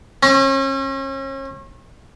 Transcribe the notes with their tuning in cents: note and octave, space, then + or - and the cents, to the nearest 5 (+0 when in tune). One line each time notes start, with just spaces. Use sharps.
C#4 -40